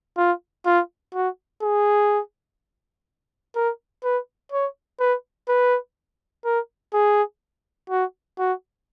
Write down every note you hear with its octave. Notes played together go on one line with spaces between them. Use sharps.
F4
F4
F#4
G#4
A#4
B4
C#5
B4
B4
A#4
G#4
F#4
F#4